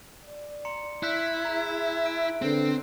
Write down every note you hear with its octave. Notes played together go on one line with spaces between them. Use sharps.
D5
A#5 C6 C#7
E4 F#6 G6 B6
G#4 E5 A#5
D7
A1 B2 D3 C4 B4